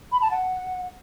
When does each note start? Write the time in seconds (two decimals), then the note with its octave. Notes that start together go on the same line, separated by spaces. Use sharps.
0.12 B5
0.21 A5
0.30 F#5